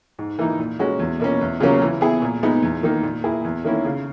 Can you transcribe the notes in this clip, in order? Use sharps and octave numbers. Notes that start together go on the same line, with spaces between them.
G#2
E3 A#3 D#4
A#2
G#3 C#4 F#4
E2
B2 A#3 C#4
E2
C#3 F#3 A#3 C#4
E3
B3 E4 G#4
A#2
G#3 B3 D#4
E2
D#3 A#3 D#4
A#2
A#3 E4 G#4
E2
D#3 A#3 C#4 E4
C#3